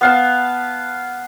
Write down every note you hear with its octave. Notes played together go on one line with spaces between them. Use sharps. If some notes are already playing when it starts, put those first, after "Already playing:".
B3 F5 A5